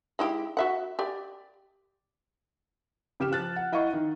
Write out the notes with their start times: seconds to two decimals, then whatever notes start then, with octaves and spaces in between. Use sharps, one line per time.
0.19 G#3 E4 G4
0.57 F#4 E5 F#5
0.99 G4 D5
3.20 C#3 G4 F6 E7
3.31 F3 F#6 A6
3.56 F#5
3.72 E4 D#5 F5 F#5 C#6
3.93 D#3